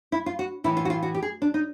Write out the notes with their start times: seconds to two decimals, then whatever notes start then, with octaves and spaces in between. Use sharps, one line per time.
0.12 E4
0.26 F4
0.39 F#4
0.64 A2 E3 E4
0.77 F4
0.85 F#4
0.90 F4
1.03 F#4
1.15 G4
1.23 G#4
1.42 D4
1.54 D#4